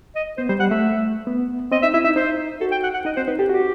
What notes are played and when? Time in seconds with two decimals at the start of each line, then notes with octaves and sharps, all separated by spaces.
0.16 D#5
0.37 B3 C5
0.49 G3 C5
0.60 G3 F#5
0.71 A3 E5
1.27 B3
1.72 C4 D#5
1.83 D#4 E5
1.94 E4 E5
2.04 D#4 E5
2.16 D#4 C5
2.61 F#4 A4
2.72 G5
2.84 F#5
2.94 F#5
3.05 D#4 D#5
3.17 C4 C5
3.28 D#4 B4
3.38 G4 A4
3.50 F#4 G4